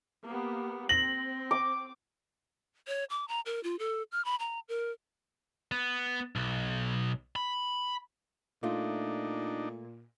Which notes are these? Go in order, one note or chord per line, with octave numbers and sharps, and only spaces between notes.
A#3 B3 G4
C4 A#6 F#7
D6
C#5
D6
A#5
A#4
F4
A4
F6
B5
A#5
A#4
B3
B1
B5
A#2 A3 D4 D#4 F4